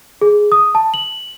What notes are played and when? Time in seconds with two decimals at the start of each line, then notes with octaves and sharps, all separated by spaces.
0.21 G#4
0.52 D#6
0.75 A5
0.94 F#7